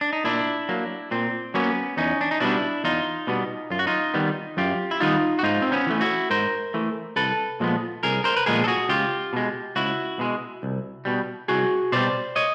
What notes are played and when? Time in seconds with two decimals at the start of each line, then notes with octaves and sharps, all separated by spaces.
0.01 D4
0.13 D#4
0.24 A#2 D4 E4
0.69 F#3 A#3
1.11 A#2 C4
1.54 F#3 A#3 B3 C#4
1.97 E2 C#4 D#4
2.21 D4
2.31 D#4
2.40 B2 G3 B3 D4 E4
2.84 E2 D#4 F4
3.27 B2 G3 B3
3.71 F#2 F4
3.79 F#4
3.87 D#4 F4
4.14 D#3 G3 B3
4.57 F#2 F4 G4
4.91 E4
5.00 D#3 G3 B3 D#4 F4
5.39 F#4
5.43 G#2 D#4 F4
5.62 C4
5.72 B3 C#4
5.87 E3 A3
6.01 E4 F#4
6.30 G#2 A#4 C5
6.74 E3 A3
7.16 C2 A4 B4
7.60 A#2 F3 G#3 B3
8.03 C2 G#4 A#4
8.24 A#4 C5
8.36 B4
8.46 A#2 F3 G#3 B3 G#4 A#4
8.64 A4
8.68 F#4 G#4
8.89 C#2 F4 G4
9.33 B2 G#3
9.76 C#2 E4 F#4
10.19 B2 G#3
10.63 C2
11.05 B2 G3
11.48 C2 F#4 G#4
11.92 B2 G3 C5 D5
12.36 C#5 D#5